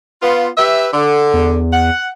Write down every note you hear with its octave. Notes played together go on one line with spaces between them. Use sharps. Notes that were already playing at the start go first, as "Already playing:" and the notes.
B3 F4
G4 B4 E5
D3
E2
F#5